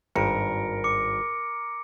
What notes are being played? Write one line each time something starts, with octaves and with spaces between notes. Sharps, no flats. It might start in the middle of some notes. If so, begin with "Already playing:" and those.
G#1 G2 A#4 C#7 D7
D6 C#7